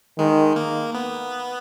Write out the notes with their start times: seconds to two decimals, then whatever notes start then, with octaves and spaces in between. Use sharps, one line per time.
0.18 D#3 G#3
0.56 A#3
0.95 B3